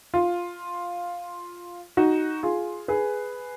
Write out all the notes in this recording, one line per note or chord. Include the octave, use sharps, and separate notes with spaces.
F4
D#4 F#4
F4 G#4
G#4 B4